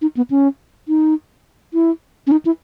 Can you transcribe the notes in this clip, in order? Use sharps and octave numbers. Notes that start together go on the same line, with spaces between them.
D#4
B3
C#4
D#4
E4
C#4
D#4
E4